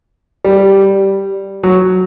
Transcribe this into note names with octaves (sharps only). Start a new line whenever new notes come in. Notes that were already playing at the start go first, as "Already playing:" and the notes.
G3
F#3